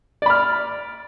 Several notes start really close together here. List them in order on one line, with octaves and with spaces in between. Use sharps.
D5 B5 F6